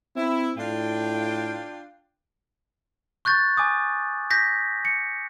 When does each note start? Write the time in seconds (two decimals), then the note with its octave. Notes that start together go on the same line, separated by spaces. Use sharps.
0.16 C4 E4
0.57 A2 D4 F4 G5
3.25 C#6 F#6 G6 A6
3.57 G#5 D6 D#6
4.31 G6 A#6 B6
4.85 C#7